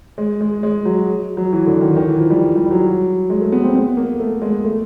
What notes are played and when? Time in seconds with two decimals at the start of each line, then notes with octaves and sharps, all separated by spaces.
0.18 G#3
0.41 G#3
0.63 G#3
0.85 F#3
1.37 F#3
1.53 E3
1.67 D3
1.81 D#3
1.96 D#3
2.08 E3
2.19 F3
2.30 G3
2.56 G3
2.71 F#3
3.30 G#3
3.41 A3
3.52 B3
3.63 C4
3.75 B3
3.97 A#3
4.20 A3
4.42 G#3
4.65 A3